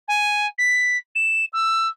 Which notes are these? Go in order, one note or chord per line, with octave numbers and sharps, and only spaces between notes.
G#5
B6
E7
E6